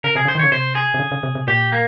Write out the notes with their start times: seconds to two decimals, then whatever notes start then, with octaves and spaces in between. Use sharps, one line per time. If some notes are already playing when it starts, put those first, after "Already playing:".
0.04 C#3 A#4
0.15 C3 G#4
0.25 C#3 C5
0.35 D#3
0.39 C#3 C#5
0.52 C3 C5
0.75 G#4
0.94 C3
0.99 C#3
1.12 C#3
1.23 C3
1.35 C3
1.47 A#2 G4
1.72 A#3